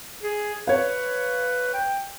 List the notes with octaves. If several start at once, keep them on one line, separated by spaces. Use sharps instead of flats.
G#4
B4 C#5 F5
G5